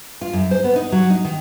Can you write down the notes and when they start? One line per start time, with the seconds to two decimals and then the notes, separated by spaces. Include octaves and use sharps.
0.21 F4
0.33 F#2
0.51 C5
0.64 B3
0.76 D#4
0.92 F#3
1.10 D#4
1.25 D#3